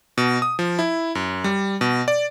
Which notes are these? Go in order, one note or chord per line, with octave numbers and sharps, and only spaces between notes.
B2
D#6
F3
E4
F#2
G3
B2
D5